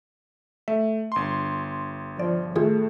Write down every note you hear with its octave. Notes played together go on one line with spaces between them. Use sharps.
A3 E5
G1 C6
F3 D5
A2 D#3 A3 F4 G#4